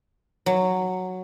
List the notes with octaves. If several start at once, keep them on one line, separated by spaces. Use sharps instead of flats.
F#3